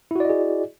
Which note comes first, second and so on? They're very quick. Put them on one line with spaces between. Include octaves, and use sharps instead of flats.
E4 F#4 D5 D#5 G#4